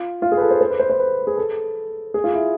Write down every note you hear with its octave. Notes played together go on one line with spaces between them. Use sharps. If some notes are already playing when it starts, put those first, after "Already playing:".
Already playing: F4
F4
G#4
B4
A4
C5
C5
B4
C5
C5
B4
G#4
A4
G#4
F4
E4